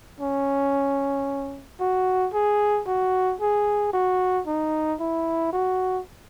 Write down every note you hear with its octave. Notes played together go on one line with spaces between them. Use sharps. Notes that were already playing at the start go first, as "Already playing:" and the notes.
C#4
F#4
G#4
F#4
G#4
F#4
D#4
E4
F#4